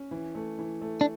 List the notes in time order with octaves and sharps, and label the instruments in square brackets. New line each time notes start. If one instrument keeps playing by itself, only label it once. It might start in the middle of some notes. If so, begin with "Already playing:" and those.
Already playing: [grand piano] C#4
E3
A3
E3
A3
[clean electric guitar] D4